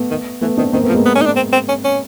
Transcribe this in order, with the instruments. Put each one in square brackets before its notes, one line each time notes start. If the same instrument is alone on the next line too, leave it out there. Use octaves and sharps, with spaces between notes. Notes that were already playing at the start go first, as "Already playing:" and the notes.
Already playing: [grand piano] A3 B3
[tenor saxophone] D#3
[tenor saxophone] E3 [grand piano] A3 B3
[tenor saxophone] D#3 [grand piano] C4 D4
[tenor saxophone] D#3 [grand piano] A#3 C4
[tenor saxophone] F3 [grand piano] A3 B3
[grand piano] G#3 A#3
[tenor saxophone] B3
C#4
D#4
D4
C4
C4
C#4
C#4